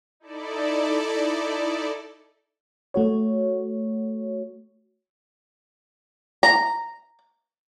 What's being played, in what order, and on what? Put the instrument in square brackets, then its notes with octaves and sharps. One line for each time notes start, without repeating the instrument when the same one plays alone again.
[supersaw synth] D#4 E4 A4 D5
[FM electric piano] A3 F#4 C#5
[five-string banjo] A#5